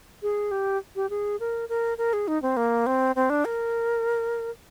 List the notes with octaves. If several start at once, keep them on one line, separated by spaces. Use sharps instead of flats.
G#4
G4
G4
G#4
A#4
A#4
A#4
G#4
D#4
C4
A#3
C4
C4
D4
A#4